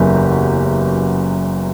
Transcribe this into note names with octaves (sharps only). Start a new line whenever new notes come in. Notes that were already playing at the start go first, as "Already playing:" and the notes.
Already playing: F#1 E2 C#3 F#3 B3 G4